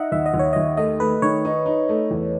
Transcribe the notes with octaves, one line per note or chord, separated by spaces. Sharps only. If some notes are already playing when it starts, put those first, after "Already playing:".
Already playing: D#4 D#5 E5 F#5
D#2 E5
D#5
D#2
C#5
D#2 D#5
A3 D#5
A3 B4
D#3 C#5
D#4
D#4
A3
E2